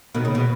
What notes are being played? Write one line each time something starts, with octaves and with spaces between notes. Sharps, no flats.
B2 D#3
C#3
B2